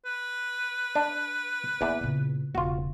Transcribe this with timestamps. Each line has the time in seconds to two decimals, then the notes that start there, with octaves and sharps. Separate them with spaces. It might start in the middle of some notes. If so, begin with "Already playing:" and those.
0.05 B4
0.95 D4 D5
1.81 E2 A#3 D5 E5
2.01 A#2 C#3
2.55 E1 C#3 F4 F#4